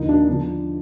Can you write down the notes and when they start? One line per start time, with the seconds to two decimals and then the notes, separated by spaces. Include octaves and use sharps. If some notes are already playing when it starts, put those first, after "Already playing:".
Already playing: D#2 D3 F3 D#4
0.09 D4
0.28 D3 F3 D4